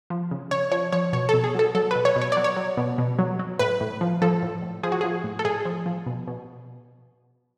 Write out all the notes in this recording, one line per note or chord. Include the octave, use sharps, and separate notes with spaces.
F3
C#3
C#3 C#5
F3 C#5
F3 C#5
B2 C#5
A4
B2
G#4
F#3 A4
F#3 A4
B4
B2
C#5
B2
C#5
F#3 D5
C#5
F#3
B2
B2
F#3
F#3
A2 B4
A2
F3
F3 A4
A2
A2
F3 G#4
F#4
F3 G#4
A2
A4
A2 G#4
F3
F3
B2
B2